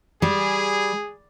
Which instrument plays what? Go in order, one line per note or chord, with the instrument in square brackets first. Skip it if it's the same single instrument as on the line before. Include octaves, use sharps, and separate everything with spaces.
[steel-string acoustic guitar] G3 [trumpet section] G#4